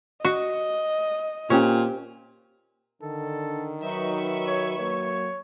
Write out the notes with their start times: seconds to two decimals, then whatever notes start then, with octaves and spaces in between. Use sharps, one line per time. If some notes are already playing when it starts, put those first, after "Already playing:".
0.25 F#4 D#5
1.50 A#2 C4 C#4 G4
3.02 D3 D#3 A4
3.82 F#3 D#4 B4 E5 C#6
4.47 C#5
4.79 F#3 A#3 C#5